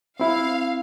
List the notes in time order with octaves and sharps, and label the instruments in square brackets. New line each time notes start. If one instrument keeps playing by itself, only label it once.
[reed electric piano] C4 E4 [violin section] F5